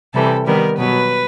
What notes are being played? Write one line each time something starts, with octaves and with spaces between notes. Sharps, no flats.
C3 E3 G3 A4
D#3 G3 B3 A#4
B2 F#3 B3 B4